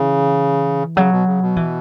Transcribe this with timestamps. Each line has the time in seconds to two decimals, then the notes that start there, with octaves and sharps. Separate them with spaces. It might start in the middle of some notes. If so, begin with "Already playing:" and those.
Already playing: C#3 E3
0.97 C#3 F#3
1.11 B2
1.26 C#3
1.41 B2
1.56 E3